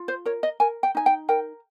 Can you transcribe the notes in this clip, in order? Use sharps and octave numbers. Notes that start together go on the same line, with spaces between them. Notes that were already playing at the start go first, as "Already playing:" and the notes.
Already playing: F4
C5
A#4 C#5
D#5
A#4 G#5
G5
D#4 G#5
G5
A#4 G5